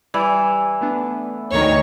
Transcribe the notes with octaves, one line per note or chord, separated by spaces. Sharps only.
E3 G3 D5
A3 B3 D4
D2 D#3 C#5